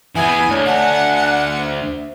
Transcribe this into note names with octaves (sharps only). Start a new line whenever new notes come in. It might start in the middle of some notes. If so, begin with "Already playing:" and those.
E3 B3 E5 F#5 G#5 D#6
D2 C#5 A5
F#5 G#5 A5
D4 C5 E5